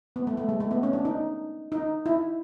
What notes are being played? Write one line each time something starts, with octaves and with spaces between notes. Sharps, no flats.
B3
A3
A3
G#3
A3
B3
C#4
D4
D#4
D#4
E4